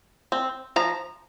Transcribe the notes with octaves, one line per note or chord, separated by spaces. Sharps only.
C4
F3 A#5